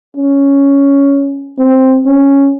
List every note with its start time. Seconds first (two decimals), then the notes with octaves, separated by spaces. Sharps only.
0.17 C#4
1.58 C4
2.06 C#4